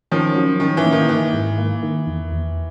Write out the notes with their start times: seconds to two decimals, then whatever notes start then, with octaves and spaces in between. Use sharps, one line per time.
0.11 D#3 F3 C#4
0.35 F#3
0.60 D#3 C#4
0.77 E3
0.85 A#3
0.92 D#3
1.09 D#3 E3
1.33 G#2
1.58 A#3
1.83 D#3
2.07 E2
2.32 E2